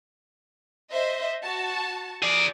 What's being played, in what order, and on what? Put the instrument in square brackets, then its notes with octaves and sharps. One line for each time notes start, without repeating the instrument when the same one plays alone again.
[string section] C5 D#5 E5
F#4 A5
[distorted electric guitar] G#4 D5